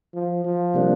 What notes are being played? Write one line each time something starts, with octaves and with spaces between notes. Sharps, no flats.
F3
F3
C3 G3 A#3 D4